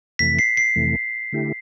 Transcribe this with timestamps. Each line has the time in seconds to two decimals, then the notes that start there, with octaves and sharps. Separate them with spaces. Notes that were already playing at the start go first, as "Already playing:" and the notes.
0.19 F2 C3 E3 A3 B6
0.39 C7
0.57 C7
0.76 F2 C3 E3 A3
1.32 D3 A3 E4 G4